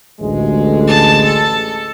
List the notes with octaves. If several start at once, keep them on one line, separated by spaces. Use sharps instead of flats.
A1 D2 G#3
A5
A4